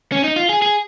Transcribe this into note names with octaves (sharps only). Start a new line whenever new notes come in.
C#4
D#4
F4
G#4
G#4